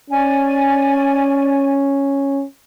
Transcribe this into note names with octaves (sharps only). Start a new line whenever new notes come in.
C#4 D5 G#5